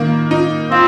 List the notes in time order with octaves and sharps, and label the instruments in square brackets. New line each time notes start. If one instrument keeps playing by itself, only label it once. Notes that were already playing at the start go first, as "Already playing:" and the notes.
Already playing: [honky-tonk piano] D#3 A#3
D#4
[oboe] C4 [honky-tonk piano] F4